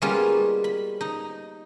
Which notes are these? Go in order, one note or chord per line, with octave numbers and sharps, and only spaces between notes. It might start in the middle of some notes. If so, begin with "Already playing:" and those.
G3 G#3 A#3 B3 C#4 F4
B5
D#4